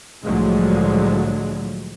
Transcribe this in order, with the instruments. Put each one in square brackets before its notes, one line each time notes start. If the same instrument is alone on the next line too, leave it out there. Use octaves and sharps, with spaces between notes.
[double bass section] C2 A2 D3 F3 F#3 G#3